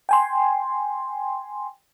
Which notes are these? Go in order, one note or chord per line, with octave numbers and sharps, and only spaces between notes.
G5 G#5 C6